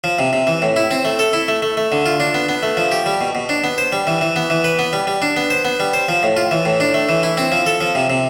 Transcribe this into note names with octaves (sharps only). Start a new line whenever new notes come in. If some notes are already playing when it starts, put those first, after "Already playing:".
F3
C3
C3
E3
A2
E4
C4
A3
A4
E4
A3
A3
A3
D3
F4
D4
B3
B3
A3
F3
G4
G3
B2
B2
D4
B3
C5
G3
E3
E3
B3
E3
B4
B3
G3
G3
D4
B3
C5
B3
G3
C5
F3
A2
F4
E3
A2
D4
A3
E3
E4
C4
F3
A4
F3
C3
C3